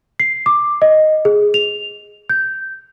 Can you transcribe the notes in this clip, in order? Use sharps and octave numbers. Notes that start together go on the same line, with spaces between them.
C7
D6
D#5
G#4
F7
G6